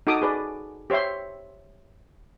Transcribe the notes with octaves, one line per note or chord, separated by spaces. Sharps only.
D#4 F#4 A4 D6 D#6
G#4 B4 D5
G4 C5 C#5 E5 C6